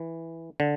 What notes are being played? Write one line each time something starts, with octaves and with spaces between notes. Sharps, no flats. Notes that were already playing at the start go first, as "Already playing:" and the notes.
Already playing: E3
D3